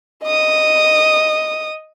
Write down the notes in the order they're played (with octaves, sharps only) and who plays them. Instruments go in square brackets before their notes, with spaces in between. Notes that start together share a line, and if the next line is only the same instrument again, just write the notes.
[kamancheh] D#5 D#6